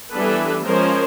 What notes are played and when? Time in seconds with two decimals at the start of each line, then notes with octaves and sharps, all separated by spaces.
0.12 E3 G3 B3 D4 A4 B4
0.64 F3 G#3 C#4 A#4 C5